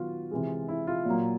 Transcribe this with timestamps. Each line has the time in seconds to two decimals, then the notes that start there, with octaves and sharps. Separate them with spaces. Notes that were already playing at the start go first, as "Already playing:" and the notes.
Already playing: D#3 F#3 B3 F4 F#4
0.31 C3 E3 G#3
0.68 E4
0.87 F4
1.05 A#2 F#3 A#3